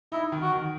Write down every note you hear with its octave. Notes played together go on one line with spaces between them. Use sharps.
D#4 E4
D#3
F#4
D#3